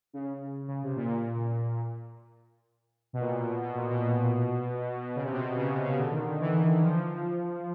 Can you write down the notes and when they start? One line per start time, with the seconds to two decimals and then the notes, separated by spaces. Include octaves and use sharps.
0.13 C#3
0.68 C#3
0.83 C3
0.96 A#2
3.13 B2
3.20 A#2
3.34 B2
3.47 B2
3.62 B2
3.75 A#2
3.90 B2
5.16 C#3
5.25 C3
5.32 B2
5.42 C3
5.56 C#3
5.70 C3
5.84 C#3
5.98 D3
6.12 D#3
6.27 D#3
6.40 E3
6.82 F3